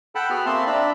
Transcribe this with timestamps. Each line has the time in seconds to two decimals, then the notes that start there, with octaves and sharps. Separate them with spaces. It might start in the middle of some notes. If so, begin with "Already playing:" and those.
0.15 A4 F#5 G5 A5 B5
0.30 B3 F#4 G#4 B4 B5 F6
0.46 A#3 C4 E5 A5 B5 C6
0.67 D4 D5 E5 A#5 B5